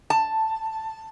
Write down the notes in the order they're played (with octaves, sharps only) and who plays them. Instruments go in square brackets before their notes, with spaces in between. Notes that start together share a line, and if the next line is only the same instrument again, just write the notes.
[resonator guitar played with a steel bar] A5